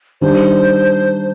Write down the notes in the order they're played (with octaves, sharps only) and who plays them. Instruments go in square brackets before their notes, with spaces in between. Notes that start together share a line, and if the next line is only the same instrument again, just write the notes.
[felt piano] D#3 G3 D4 [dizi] C5